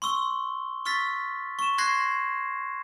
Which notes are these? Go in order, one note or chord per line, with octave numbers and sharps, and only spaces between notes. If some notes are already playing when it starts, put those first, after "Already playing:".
C6 C#6 E6 G7
C#6 E6 F6 A6 B6
C#6 E7
C6 C#6 F#6 G#6 A#6 C7